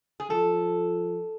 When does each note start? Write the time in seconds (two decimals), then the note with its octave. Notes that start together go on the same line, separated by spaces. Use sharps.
0.20 G#4
0.29 F3 A4